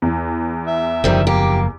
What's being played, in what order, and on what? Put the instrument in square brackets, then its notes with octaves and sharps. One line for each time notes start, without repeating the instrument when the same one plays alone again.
[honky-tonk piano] E2
[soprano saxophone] E5
[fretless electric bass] F#1 F3 [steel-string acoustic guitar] D#3 G3 C4
[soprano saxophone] A#3 [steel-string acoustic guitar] G4